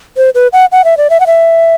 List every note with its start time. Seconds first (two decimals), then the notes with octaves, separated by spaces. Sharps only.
0.17 C5
0.35 B4
0.53 F#5
0.72 F#5
0.85 E5
0.97 D5
1.10 E5
1.20 F#5
1.27 E5